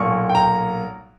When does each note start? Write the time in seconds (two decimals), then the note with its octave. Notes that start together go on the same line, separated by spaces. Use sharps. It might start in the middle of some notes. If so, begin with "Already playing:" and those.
Already playing: B1 A#2 A#3 C#6
0.29 G5
0.35 A#5